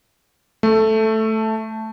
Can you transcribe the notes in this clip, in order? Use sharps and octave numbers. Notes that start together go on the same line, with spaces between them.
A3